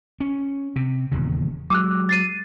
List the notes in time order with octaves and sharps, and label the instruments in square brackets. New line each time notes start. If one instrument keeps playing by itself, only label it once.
[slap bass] C#4
C3
D#1 E2 C#3
[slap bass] F#3 G#3 [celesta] D6 E6 F#6
[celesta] A6 C7 D#7